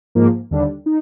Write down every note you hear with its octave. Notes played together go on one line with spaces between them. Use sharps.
G#2 F3 A#3
D#2 D3 G3 D4
D#4